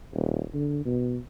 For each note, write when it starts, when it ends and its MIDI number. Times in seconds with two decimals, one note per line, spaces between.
0.14 0.42 27
0.54 0.83 50
0.85 1.17 47